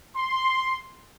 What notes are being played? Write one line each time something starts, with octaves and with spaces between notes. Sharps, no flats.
C6